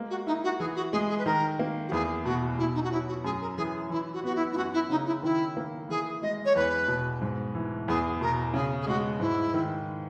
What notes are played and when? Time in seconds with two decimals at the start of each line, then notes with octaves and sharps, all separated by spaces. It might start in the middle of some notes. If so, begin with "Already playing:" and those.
Already playing: G#3 A#3
0.10 F#4
0.26 D#4 E4
0.43 F#4
0.59 E3 G#4
0.76 F#4
0.92 G#3 G#4
1.09 G#4
1.18 B4
1.25 D#3 A#4
1.59 A#3
1.88 F#4
1.92 E2 G#4
2.24 B2 F#4
2.59 B2 E4
2.74 D#4
2.83 F#4
2.91 F#3 E4
3.08 F#4
3.24 F#2 G#4
3.41 A#4
3.57 E3 G#4
3.90 E3 E4
4.13 F#4
4.24 B3 F#4
4.35 E4
4.52 E4
4.56 F#2 F#4
4.73 E4
4.90 C#3 D#4
5.06 E4
5.23 D#3 E4
5.57 A#3
5.89 E3 G#4
6.22 G#3 D#5
6.45 C#5
6.55 E2 B4
6.88 B2
7.22 G#2
7.55 E3
7.88 E2 G#4
8.21 B2 A#4
8.54 C#3 G#4
8.81 G#4
8.87 G#3 F#4
9.20 G#2 E4
9.54 D#3